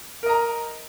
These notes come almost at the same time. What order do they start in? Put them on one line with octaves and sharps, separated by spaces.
A#4 D#5 A#5